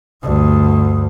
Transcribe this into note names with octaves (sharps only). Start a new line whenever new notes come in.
D2 G2